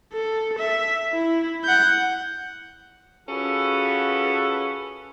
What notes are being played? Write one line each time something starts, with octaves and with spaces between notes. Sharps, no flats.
A4
E5
E4
F#5 G6
C#4 F4 F#4 G#4 A4 B4